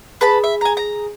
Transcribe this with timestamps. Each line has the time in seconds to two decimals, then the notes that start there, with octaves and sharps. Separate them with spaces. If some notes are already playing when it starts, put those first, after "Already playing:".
0.21 G#4 B4 A5 B5
0.44 E5
0.61 G#5 A#5
0.77 A#5